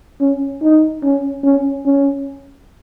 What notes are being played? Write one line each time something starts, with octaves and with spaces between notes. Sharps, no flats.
C#4
D#4
C#4
C#4
C#4